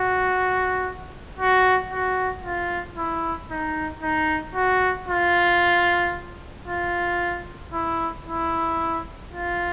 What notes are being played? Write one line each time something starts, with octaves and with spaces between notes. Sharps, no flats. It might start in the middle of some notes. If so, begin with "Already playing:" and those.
Already playing: F#4
F#4
F#4
F4
E4
D#4
D#4
F#4
F4
F4
E4
E4
F4